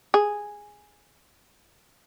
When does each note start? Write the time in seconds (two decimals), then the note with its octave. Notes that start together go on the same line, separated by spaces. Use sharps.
0.14 G#4